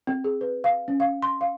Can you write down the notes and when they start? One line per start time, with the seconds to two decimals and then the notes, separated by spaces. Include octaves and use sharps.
0.07 C4
0.24 G#4
0.41 B4
0.64 F5
0.88 C#4
1.00 F5
1.22 C6
1.41 F5